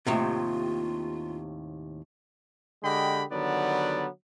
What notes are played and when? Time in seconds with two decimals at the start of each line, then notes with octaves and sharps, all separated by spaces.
0.07 D#2 A2 C3 F4
2.82 D3 G#3 G4 D#5 G5 B5
3.30 D3 D#3 F#3 G3 B3 D5